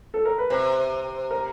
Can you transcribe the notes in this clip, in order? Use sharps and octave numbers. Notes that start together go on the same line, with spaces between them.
A4
A#4
B4
C3 C5
A#4